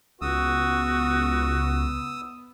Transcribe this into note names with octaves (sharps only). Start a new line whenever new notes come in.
C#2 B3 F#4 D#6 E6